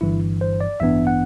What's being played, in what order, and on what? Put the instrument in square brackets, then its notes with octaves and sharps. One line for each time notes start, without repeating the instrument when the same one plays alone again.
[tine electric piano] G1 G2 E3 E4
C5
D5
A1 G2 E3 B3 D4 E5
F#5